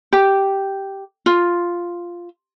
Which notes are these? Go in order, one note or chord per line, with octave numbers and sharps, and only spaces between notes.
G4
F4